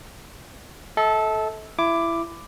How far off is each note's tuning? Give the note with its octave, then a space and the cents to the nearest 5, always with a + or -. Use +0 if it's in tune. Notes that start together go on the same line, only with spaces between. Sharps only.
A4 -15 E5 -45
E4 +20 D6 +0